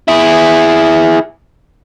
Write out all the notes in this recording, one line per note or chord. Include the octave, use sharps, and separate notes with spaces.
E4 G#4